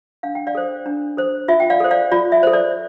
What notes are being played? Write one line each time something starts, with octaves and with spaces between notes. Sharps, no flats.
D4 F5
G5
D5 F5
A4 C5
D4
A4 C5
F4 E5
G5
D5 F5
A4 C5
D5 F5
F4 D5
E5
A4 C5
D5